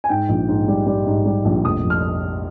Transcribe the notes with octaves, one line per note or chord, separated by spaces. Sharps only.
G#5
G#2 G5
A#1
G#2
G3
G3
G#2
G3
A#1
F1 D#6
F2
F6